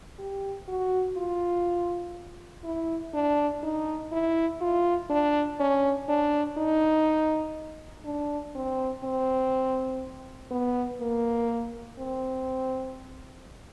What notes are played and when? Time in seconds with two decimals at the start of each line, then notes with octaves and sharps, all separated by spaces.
0.19 G4
0.68 F#4
1.17 F4
2.64 E4
3.14 D4
3.63 D#4
4.12 E4
4.61 F4
5.10 D4
5.60 C#4
6.09 D4
6.58 D#4
8.05 D4
8.55 C4
9.04 C4
10.51 B3
11.01 A#3
11.99 C4